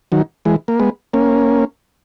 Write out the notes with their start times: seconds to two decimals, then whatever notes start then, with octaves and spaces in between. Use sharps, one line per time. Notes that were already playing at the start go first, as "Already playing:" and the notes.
0.12 D#3 F#3
0.45 E3 G#3
0.68 A#3
0.79 G#3 B3
1.13 A#3 C#4